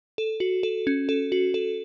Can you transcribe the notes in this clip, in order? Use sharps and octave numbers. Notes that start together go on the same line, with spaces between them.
A4
F#4
A4
C#4
A4
F#4
A4